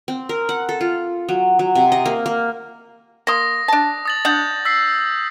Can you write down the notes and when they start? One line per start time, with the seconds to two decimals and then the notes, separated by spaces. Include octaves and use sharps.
0.08 C4
0.29 A#4
0.49 F#5
0.69 A4
0.81 F4
1.29 F#3
1.59 F#3
1.75 C3
1.92 D#5
2.06 A#3
2.26 A#3
3.27 A#3 C6 D#6 A#6
3.68 D4 A5
4.05 D#6 A6 F#7
4.25 D4 F#5 D#6 G6
4.65 E6 B6 C7